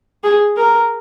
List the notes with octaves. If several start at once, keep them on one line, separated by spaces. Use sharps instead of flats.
G#4
A#4